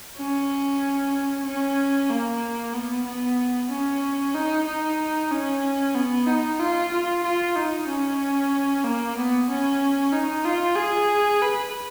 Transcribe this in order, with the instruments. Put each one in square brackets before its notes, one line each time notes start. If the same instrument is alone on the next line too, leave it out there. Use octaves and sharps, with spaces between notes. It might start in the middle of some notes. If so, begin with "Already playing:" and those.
[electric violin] C#4
C#4
A#3
B3
B3
C#4
D#4
D#4
C#4
B3
D#4
F4
F4
F4
D#4
C#4
A#3
B3
C#4
D#4
F4
G#4
B4